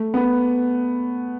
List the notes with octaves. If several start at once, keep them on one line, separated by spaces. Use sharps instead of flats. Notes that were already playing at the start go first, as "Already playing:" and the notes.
Already playing: A3
B3